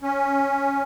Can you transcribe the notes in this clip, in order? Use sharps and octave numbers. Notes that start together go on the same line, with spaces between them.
C#4